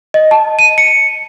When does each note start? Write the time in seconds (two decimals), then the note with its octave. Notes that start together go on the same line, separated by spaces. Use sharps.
0.14 D#5
0.31 A5
0.59 D#7
0.78 C#7